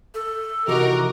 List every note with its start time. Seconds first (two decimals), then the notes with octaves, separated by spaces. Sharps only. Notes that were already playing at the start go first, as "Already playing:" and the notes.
0.14 A4
0.68 C3 E3 F3 D#4 F#4 G4 A#4